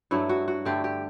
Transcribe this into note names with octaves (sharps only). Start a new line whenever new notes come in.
G2 F#3 A3 E4
F#4
F#4
G2 D3 A3 G4
G4